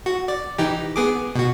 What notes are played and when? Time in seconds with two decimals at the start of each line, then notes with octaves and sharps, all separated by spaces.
0.06 F#4
0.28 D5
0.58 E3 D#4 G4
0.96 B3 G#4 D6
1.35 B2 F#4